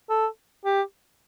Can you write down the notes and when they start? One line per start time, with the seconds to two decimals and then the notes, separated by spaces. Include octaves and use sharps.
0.10 A4
0.65 G4